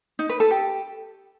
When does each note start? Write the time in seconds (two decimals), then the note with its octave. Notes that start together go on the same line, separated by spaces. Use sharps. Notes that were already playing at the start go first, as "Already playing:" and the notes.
0.19 D#4
0.29 B4
0.40 A4
0.51 G4